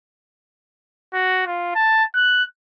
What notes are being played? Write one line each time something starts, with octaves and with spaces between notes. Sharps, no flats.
F#4
F4
A5
F#6